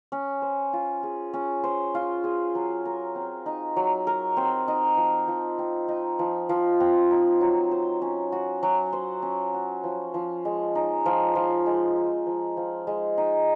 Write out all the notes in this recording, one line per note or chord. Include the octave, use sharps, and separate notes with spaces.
C#4
C5
F4
G#4
C#4
C5
F4
G#4
F#3
A#4
C4
D#4
F#3
A#4
C4
D#4
F3
F3
C4
D#4
F3
F3
C4
D#4
F#3
C5
C#4
F#4
F#3
C5
C#4
F#4
F3
F3
G#3
D#4
F3
F3
G#3
D#4
F3
F3
G#3
D#4